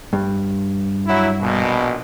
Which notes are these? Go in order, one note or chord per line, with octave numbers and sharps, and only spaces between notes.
G2
F#3 E4
A#1 B2